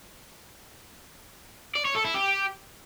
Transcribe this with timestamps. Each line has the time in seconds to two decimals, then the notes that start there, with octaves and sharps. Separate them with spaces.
1.75 D5
1.85 C#5
1.95 A4
2.05 E4
2.14 G4